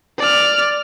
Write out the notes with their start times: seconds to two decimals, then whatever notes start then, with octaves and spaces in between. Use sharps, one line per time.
0.19 D5 F6